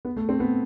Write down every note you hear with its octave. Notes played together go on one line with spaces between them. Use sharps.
B3
A3
C4
B3